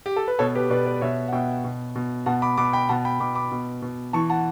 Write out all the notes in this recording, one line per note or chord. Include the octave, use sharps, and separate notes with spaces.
G4
A4
B4
B2 A4 C#5
G4 B4
B2 B4 D5
B4 D5
B2 C#5 E5
F#5
B2 E5 G5
B2
B2
B2 F#5 A5
B5 D6
B2 B5 D6
G5 B5
B2 F#5 A5
G5 B5
B2 B5 D6
B5 D6
B2
B2
E3 A5 C#6
F#5 A5